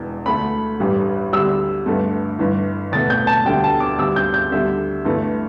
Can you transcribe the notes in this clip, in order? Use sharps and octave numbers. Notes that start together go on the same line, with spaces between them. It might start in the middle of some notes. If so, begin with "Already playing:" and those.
Already playing: E1 E2 E3
D2 D3 A3 B5
A1 G2 G3
D2 D3 G3 E6
G1 G2 D3 A3
G1 G2 E3
E2 B2 A3 A6
G6
A5
D2 D3 G3 G5
A5
D6
D2 D3 G3 E6
G6
G6
D2 D3 G3 E5
G1 G2 E3 A3